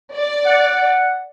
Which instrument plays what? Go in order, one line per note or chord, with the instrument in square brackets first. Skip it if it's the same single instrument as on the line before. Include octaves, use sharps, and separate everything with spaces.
[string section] D5
[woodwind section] F#5